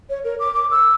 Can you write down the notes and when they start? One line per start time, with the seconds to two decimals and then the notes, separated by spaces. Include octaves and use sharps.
0.09 C#5
0.24 A#4
0.39 D6
0.54 D6
0.71 E6